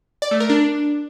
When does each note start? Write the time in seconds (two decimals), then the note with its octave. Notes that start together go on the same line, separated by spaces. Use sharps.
0.22 D5
0.31 A3
0.40 A#4
0.50 D4